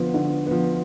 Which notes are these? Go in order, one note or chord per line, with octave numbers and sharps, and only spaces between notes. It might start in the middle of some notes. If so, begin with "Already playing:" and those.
Already playing: D3 F3 B3
D3
F3 B3